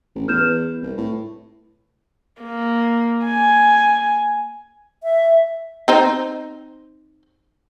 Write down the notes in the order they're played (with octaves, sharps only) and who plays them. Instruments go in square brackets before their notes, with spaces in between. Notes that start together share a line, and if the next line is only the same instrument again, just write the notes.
[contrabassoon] A1
[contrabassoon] E2 [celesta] F6 G6 E7
[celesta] B4
[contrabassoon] C2
A2
[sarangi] A#3
G#5
[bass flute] E5
[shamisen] C4 D#4 C5